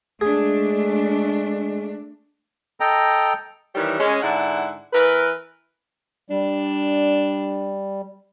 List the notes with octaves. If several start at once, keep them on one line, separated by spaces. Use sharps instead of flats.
G#3 A3 D4 G#4
A4 D#5 G5 A#5
D#3 E3 G3 G4 C#5
G#3 C#4
G#2 D3 E4 F#5
E3 A#4 B4
G3 D4